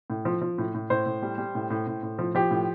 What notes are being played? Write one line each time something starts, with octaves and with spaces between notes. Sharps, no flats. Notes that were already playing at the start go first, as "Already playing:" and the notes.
A2
F3
F3
A2
A2
A2 C5
A2
G3
G3
A2
A2
A2
A2
F3
F3 G4
A2